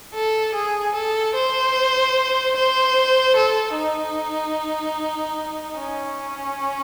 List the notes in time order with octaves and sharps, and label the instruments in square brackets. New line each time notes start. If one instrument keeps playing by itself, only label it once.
[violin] A4
G#4
A4
C5
C5
A4
D#4
C#4